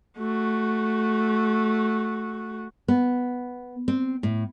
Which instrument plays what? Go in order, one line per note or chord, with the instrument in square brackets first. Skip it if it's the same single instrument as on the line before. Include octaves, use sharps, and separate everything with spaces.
[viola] A3 F#4
[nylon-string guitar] B3
C4
A2